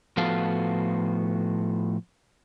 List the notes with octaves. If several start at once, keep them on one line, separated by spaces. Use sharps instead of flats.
A2 F3 B3 F#4 A4 F5